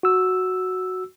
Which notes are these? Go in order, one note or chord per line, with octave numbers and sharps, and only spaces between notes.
F#4 E6